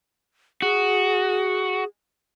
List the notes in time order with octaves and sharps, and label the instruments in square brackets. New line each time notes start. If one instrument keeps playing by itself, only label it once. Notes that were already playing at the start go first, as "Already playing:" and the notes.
[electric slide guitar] F#4 [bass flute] G#4